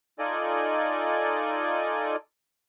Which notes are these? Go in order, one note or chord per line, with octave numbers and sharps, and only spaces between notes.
D#4 F4 A4 D5 D#5 G#5